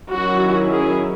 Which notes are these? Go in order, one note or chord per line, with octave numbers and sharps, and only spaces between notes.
D#3 F#3 C#4 E4 F#4
G#4